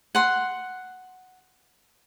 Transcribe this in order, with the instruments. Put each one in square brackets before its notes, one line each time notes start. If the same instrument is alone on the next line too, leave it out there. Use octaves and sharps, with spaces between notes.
[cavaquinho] F#5 C6